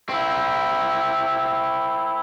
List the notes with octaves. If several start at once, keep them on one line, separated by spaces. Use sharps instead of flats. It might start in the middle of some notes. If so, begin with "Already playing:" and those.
C4 E4